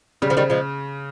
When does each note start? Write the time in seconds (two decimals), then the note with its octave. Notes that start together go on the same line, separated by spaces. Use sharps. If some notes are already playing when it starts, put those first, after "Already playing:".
0.22 C#3 G3
0.30 F3
0.37 D#3 G3
0.50 F3 G#3